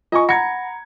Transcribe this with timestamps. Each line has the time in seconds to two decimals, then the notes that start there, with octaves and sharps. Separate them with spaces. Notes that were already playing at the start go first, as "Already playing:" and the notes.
0.12 F4 D#5 G#5 C#6
0.29 F#5 A#5 B5 G#6 A#6 C#7